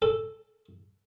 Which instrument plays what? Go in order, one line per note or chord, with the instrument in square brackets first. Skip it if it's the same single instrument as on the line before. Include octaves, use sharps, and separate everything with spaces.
[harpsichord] A4